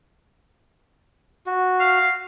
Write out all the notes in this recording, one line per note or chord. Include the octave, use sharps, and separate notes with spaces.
F#4
F5